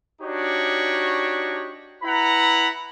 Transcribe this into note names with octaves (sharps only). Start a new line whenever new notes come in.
D4 D#4 F#4 G4 C#5
E4 B4 F#5 A#5 B5